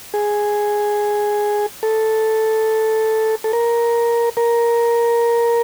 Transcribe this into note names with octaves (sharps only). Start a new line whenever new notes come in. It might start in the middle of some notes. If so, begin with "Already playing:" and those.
G#4
A4
A4
A#4
A#4